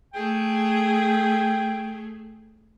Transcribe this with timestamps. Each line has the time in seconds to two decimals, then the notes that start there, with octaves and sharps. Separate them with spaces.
0.14 A3 G#4 G5